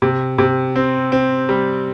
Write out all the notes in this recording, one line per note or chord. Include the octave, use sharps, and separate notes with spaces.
C3
C3
C4
C4
G3